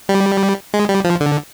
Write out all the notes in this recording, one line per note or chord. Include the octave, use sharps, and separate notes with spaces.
G3
G#3
G3
F3
D3